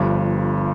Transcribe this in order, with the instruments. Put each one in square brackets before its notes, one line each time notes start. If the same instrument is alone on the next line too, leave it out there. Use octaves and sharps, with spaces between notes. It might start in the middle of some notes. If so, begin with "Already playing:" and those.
Already playing: [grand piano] G1 G2 F3